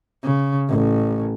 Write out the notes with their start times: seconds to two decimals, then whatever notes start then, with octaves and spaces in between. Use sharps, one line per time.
0.23 C#3
0.69 A1